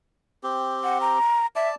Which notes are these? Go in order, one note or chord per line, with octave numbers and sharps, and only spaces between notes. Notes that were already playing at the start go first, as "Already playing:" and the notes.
C4 G4
F#5
A#5
D5 E5 A5